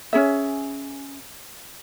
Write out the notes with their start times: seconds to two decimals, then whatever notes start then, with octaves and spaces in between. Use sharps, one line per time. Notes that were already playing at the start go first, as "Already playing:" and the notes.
0.13 C#4 G#4 E5